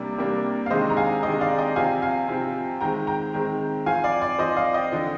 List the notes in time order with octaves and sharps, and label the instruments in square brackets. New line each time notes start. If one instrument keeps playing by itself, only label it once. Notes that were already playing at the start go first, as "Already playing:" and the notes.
Already playing: [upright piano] C3 G3 A#3 D4 D5
C3 G3 A#3 D4
F5
C3 D#3 G#3 D4 C5 D#5
A#5
F5 G#5
C3 D#3 G#3 D4 D#5 G5
D5 F5
D#5 G5
C3 F3 C4 F5 G#5
F5 G#5
C3 F3 C4
D#3 G#3 C4 G5 A#5
G5 A#5
D#3 G#3 C4
F3 C4 F5 G#5
D5 F5
D5
F3 C4 C5 D#5
D5 F5
D#5 G5
D3 F3 C4